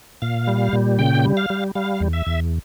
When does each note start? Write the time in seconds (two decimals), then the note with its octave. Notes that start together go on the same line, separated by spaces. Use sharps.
0.22 A#2 F5
0.47 G3
0.73 A#2
0.99 C#3 G5
1.25 G3
1.37 F5
1.50 G3
1.75 G3 F5
2.00 E2
2.13 E5
2.26 E2